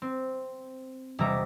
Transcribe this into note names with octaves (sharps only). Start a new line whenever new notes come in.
C4
E1 C3 G3 E5 A#5 D6